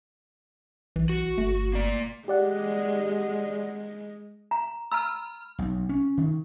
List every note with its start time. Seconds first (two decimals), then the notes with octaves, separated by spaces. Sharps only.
0.96 B1 E3
1.09 F#4
1.38 G1 A3
1.73 A#3 D5
2.28 G#3 G4 D5 F#5
4.51 A#5
4.92 A#5 B5 E6 F6
5.59 B1
5.89 C#4
6.18 D#3